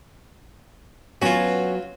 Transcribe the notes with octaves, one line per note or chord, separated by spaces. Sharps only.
F#3 B3 C#4 F4 F#4